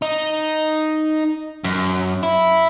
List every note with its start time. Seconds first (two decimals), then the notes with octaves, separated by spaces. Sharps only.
0.02 D#4
1.64 F#2
2.23 E4